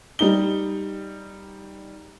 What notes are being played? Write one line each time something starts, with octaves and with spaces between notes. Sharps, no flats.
G3 D#4 G7